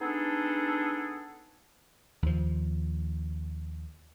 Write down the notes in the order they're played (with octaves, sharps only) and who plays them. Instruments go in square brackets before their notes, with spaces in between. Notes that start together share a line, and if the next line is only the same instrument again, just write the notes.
[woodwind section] B3 D4 D#4 G#4 A4
[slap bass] D#2 F3